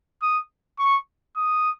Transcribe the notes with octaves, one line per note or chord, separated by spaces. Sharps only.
D#6
C#6
D#6